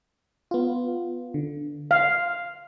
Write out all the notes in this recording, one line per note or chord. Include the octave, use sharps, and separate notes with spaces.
B3 F4
D3
F5 F6